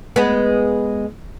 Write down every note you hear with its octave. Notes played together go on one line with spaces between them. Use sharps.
G#3 B3